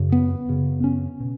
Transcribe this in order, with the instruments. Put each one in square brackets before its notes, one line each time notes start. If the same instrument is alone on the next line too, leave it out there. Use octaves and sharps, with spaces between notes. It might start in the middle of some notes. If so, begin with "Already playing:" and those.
Already playing: [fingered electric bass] F#2 C#3
B3
F#2 C#3
C#4
B2